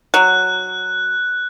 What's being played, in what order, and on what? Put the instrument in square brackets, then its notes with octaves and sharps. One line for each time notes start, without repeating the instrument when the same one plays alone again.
[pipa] F#3 [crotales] F#6